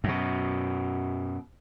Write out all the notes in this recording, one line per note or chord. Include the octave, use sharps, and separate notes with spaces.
F#2 B2